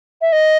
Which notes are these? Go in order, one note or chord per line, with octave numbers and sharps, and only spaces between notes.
E5
D#5